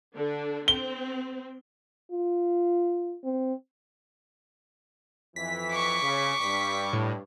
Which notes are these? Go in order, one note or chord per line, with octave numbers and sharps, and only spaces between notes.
D3 D4
C4 G7
F4
C4
F2 E3 B6
C#6 D6
C#3
G2 B6
A2